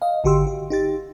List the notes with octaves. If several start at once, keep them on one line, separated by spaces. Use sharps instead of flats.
D#5 F5
G#1 D3 F#4 G4 C6 E6
G4
D#4 G4 A6